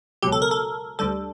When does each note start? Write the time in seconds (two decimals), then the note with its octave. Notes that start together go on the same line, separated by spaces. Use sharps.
0.22 C#2 B2 F#3 G4
0.32 A4
0.42 A#4
0.51 A4
0.99 D2 D3 G3 A4